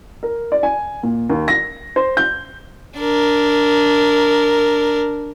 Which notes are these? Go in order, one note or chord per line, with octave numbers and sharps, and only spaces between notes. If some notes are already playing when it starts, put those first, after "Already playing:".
A#4
D5
G#5
A#2
D#2
A#6
C5
G6
D4 A#4